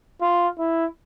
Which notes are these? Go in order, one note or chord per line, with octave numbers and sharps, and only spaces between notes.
F4
E4